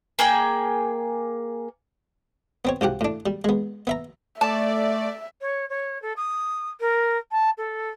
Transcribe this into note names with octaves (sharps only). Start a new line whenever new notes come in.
A#3 G#4 G5
B3 C4 C#5
C2 F3 G4 F#5
A2 D4
G3
G#3 B3
B3 E5 A#5
A3 D5 E5 A5
C#5
C#5
A4
D#6
A#4
A5
A4